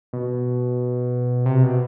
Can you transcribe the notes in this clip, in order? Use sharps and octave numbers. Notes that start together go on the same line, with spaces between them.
B2
C3
B2